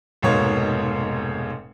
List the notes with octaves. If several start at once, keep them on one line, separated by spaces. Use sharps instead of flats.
F1 G#2 B2 A#3 C#5 F5